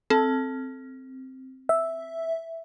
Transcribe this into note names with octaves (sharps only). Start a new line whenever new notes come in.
C4 A4
E5